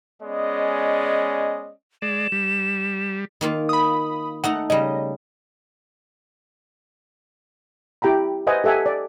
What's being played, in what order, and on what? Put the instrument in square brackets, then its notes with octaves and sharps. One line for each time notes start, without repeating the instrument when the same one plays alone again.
[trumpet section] G#3 B3 C#4 D5 D#5
[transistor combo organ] G#3 D5 [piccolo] E7
[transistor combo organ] G3
[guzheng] D#3 A#3 F4
[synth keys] B5 D#6
[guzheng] A3 D#4 A#5 [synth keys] F#5
[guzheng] C#3 G3 [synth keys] D#5
[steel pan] E4 G4 G5 A#5 B5
B4 C5 D#5 E5 F#5 G#5
G4 A4 E5 F#5 G#5
D5